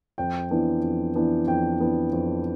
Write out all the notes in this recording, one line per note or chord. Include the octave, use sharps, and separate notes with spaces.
F2 G5
E3 B3 D4
F2
E3 B3 D4
F2 G5
E3 B3 D4
F2